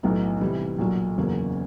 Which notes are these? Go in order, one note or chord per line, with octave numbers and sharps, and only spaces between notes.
B1 A2 F#3 B3 D#4
C3 E3 G3
B1 A#2 F#3
F#1 E2 C#3 F#3 A#3